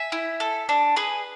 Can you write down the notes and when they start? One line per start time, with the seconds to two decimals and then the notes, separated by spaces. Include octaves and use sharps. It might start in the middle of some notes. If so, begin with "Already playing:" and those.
Already playing: E5 G#5
0.12 E4
0.40 A4
0.69 D4
0.96 G#4 B4